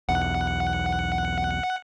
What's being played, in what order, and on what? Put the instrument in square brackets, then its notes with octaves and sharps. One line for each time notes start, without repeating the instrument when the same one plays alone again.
[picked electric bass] B1 E2 [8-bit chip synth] F#5